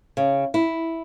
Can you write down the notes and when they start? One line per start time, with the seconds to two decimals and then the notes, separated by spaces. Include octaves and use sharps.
0.17 C#3
0.54 E4